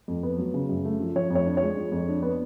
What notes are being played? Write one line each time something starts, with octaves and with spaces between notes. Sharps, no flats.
F2
B3
F#3
C#3
F#2
A3
F3
F3 C#5
F2
C#5
D4
C#5
G#3
F3
F2
D4
B3